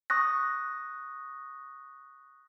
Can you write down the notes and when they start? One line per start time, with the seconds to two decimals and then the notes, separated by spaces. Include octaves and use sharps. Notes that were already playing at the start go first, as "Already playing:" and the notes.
0.10 C#6 D#6 F#6 A#6